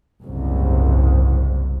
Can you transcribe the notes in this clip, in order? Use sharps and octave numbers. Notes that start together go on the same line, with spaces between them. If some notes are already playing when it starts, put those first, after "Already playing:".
F#1 C2 G#2